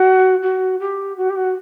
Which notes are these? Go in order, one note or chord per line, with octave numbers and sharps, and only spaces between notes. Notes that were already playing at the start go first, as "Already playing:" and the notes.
Already playing: F#4
F#4
G4
F#4
G4
F#4